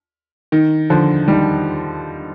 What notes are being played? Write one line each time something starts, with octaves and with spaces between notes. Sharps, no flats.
D#3
D3 F3
D#3 G3